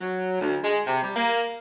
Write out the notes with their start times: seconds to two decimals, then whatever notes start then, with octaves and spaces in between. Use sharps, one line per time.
0.01 F#3
0.41 D2
0.64 G#3
0.87 C3
1.03 G3
1.16 A#3